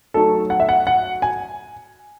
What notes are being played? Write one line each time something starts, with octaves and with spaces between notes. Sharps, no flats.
F#3 A3 D#4 A4
F#5
E5
F#5
F#5
G#5